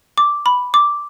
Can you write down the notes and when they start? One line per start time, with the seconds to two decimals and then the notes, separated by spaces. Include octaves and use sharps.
0.18 D6
0.46 B5
0.74 D6